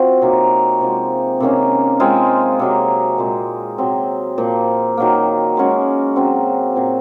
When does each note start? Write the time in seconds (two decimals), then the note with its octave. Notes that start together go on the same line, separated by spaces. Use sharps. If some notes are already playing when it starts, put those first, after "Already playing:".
Already playing: F3 C4 F#4
0.21 C3 F#3 A#3 D#4
0.81 C3 F3 G#3
1.40 C3 D#3 A#3 C#4
2.00 G#3 C4 F4 G#4
2.59 C3 F#3 A#3
3.18 A#2 G#3 C4
3.78 C3 F#3 C4
4.38 A#2 F3 A#3
4.97 D#3 F#3 A#3
5.57 G#3 C#4 F#4
6.16 C#3 F#3 C4
6.76 A#2 F#3 C4